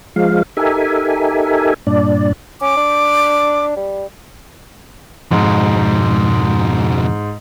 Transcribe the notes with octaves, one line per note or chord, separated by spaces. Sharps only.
F3 G#3 F5
D#4 G4 A4 A#4 E5 G#5
G2 A#2 D4 D5
C#4 D6
D4
G3
F2 G#2 B2